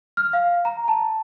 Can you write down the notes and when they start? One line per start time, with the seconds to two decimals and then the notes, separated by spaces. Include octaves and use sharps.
0.17 F6
0.33 F5
0.65 A#5
0.88 A5